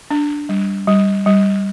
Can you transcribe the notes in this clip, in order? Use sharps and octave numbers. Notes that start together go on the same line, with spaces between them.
D4
G3
G3
G3